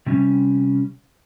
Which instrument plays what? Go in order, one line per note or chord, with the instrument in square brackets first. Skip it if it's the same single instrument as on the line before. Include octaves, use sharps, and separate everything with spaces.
[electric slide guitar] C3 G3 C#4